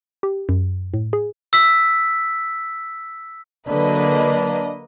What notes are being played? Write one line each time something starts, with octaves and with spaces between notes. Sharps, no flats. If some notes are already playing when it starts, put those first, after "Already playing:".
G4
F#2
A2
G#4
E6 B6
D3 F#3 A#3 D4 B4 D#5